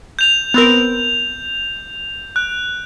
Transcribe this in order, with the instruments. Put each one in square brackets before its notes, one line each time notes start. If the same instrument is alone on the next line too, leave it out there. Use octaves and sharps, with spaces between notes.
[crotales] G6 F7
[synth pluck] B3 C4 A#4
[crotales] F#6